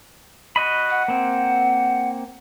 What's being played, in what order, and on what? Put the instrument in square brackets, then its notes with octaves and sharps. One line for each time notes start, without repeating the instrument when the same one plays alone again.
[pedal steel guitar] F#4 D#5 B5
[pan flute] F#5
[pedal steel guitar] A#3 C4